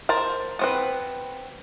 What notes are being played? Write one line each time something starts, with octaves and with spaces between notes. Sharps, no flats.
A#4 C5 A5
B3 C4 B4